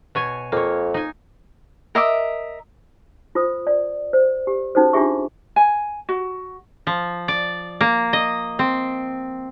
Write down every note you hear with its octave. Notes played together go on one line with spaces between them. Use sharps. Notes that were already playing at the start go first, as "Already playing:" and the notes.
B2 C#5 G#5
F2 A#3 C#5
D#4 G#5
A#4 D#5 E5 D6
F4 C5 D#6
D5
C5
G4
C#4 D#4 F#4 A4 C5
D4 F4 G4 G#4 E5 C#6
G#5
F#4
F3
D5
A#3
D#5
C4